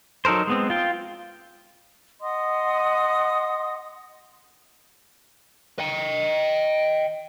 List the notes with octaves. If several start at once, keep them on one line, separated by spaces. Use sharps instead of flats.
F#3 D#4 A4 A#4 C5
G#3 B3 C4
F4 G5
D#5 F#5 C6 D#6
D#5 G5